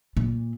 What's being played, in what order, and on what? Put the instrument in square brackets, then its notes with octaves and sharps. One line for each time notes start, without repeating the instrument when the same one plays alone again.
[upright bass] A#2